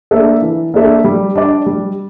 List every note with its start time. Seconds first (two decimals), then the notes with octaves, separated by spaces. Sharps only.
0.11 A#3 D4 A4 E5
0.42 E3
0.74 A#3 D4 A4 E5
1.04 G3
1.35 D4 G4 D5
1.66 G3